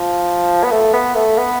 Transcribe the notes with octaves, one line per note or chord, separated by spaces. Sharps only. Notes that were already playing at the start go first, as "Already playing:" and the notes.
Already playing: F3
B3
A3
B3
A3
B3